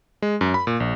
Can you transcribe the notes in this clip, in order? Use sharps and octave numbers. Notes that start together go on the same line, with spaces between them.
G#3
F#2
B5
A#2
A#1